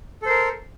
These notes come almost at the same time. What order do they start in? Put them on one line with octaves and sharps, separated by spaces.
A4 C5 A#4